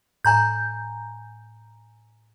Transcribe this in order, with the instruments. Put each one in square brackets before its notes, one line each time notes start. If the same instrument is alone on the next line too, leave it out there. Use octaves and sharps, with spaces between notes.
[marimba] A2 [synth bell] G#5 A#5 G6